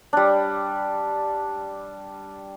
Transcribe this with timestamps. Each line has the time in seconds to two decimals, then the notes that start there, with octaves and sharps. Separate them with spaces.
0.13 G3 D4